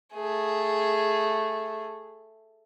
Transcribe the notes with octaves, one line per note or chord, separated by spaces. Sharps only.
A3 G#4